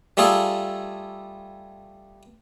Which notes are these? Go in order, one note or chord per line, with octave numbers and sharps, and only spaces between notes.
G3 A3 F4 G#4 A4